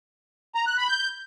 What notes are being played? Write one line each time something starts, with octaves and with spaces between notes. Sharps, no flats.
A#5
F#6
B5
G6